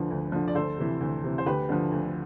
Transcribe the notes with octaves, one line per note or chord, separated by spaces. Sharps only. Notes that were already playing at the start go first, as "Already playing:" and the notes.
Already playing: D2 D3 F3 B4
D2
D3 F3
D5
D2 A4 C5
C3 E3
D2
C3 E3
C5
D2 G4 B4
D3 F3
D2